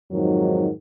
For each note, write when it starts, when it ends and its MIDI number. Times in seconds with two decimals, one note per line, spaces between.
0.12 0.69 41
0.12 0.69 44
0.12 0.69 51
0.12 0.69 54